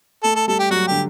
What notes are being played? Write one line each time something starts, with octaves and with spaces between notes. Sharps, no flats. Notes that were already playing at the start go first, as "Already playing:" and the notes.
A3 A4
A4
G3 A4
G4
F#3 F#4
D3 G4